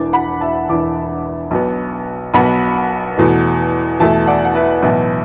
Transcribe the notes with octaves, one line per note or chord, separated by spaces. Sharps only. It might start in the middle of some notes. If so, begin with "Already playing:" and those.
Already playing: E1 E2 E3 D4 A5 D6
F#5 B5
E5 A5
E1 E2 E3 D4 A5 D6
B1 B2 B3
B1 B2 B3 F#5 B5
E2 B2 A3
E2 B2 A3 E5 A5
D5 F#5
F#5
B4 E5
B1 A2 E3 B3